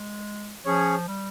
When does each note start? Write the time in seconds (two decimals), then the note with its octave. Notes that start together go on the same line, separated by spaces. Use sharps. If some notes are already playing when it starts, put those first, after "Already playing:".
Already playing: G#3
0.65 F3 C#4 G#4 C#5
1.08 G3